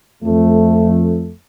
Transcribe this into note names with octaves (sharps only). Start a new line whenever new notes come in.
F2 A3